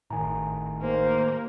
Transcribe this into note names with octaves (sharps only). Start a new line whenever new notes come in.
G#1 A2 D#3 G#5 A#5
D#2 A#3 C5